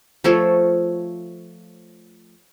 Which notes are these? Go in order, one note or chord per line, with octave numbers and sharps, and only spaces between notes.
F3 A3 A4 C#5